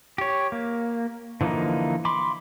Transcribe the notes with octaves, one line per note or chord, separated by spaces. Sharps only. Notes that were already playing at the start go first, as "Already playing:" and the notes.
G4 C#5
A#3
D3 E3 F3 A#3 D#4
B5 C6 D6